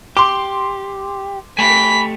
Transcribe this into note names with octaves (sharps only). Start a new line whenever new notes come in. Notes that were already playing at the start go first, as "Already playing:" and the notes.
G4 C6 D6
A3 G4 G#5 B5 B6